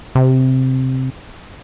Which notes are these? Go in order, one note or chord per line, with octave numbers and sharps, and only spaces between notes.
C3